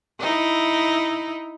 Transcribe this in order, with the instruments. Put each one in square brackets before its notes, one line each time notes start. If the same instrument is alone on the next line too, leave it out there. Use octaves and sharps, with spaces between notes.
[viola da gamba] D#4 E4